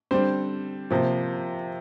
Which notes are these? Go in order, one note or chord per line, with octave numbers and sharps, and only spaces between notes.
D3 G3 C4 C5
C3 F3 A#3